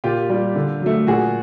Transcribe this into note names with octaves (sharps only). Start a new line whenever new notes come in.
A#2 F4 G4
G3
D3
F#3 A3
A#2 F#4 G#4